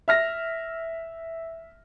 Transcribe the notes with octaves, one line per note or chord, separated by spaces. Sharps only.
E5 F6 A#6